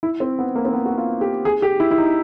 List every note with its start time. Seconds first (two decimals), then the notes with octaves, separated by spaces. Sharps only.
0.03 E4
0.20 C4
0.39 B3
0.56 A#3
0.65 C4
0.73 B3
0.86 F#4
0.98 F4
1.21 G4
1.45 G#4
1.62 G4
1.80 E4
1.91 E4
1.98 D#4